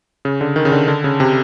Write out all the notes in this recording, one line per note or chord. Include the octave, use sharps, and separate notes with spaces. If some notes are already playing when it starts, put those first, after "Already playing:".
C#3
D3
D#3
C#3
D3
D3
C#3
C3